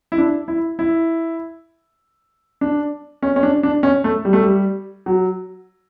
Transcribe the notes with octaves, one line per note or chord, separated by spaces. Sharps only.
E4
D4
E4
E4
D4
C#4
C#4
D4
D4
C#4
A3
G3
A3
G3
F#3